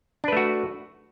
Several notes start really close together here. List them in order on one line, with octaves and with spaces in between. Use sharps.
D4 B4 A3 F#4